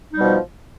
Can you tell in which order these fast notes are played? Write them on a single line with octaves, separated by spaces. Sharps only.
D#4 G3 B2 F3